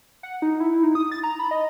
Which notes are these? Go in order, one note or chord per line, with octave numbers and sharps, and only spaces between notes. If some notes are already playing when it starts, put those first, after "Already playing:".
F#5
D#4
E4
D#4
D#6
A6
A#5
B5
D#5